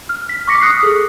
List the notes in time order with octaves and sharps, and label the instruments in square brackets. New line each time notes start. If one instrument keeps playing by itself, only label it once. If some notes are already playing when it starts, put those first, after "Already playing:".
[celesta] F6
B6
C#6 D6 F6 A#6 B6 C#7
D#6 F#6 B6 C7
G#4 A4